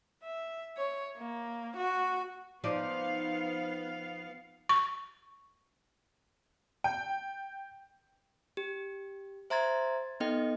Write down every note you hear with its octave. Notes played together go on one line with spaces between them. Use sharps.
E5
C#5
A#3
F#4
F3 B3 D#4 D5 F5
C#6
G5
G4
C5 E5 A#5 C6 G#6 A6
B3 D#4 A4 D#5 G5